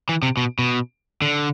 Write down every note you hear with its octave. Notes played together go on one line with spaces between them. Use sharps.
E3
C3
B2
B2
D3